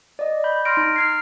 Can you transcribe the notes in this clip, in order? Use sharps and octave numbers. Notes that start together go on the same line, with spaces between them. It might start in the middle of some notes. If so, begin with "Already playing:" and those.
D5 D#5
B5 G6
C6 F6 A#6 D7
D#4
F6 G#6 C7